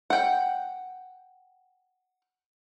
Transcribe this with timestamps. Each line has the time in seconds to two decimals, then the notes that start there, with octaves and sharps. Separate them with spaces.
0.10 F#5 G5